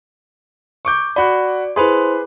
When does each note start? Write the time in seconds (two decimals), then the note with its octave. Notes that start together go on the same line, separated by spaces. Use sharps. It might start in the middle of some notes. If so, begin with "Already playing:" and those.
0.85 C#6 D6 G6
1.16 F#4 D5 B5
1.76 E4 G#4 B4 C5 C6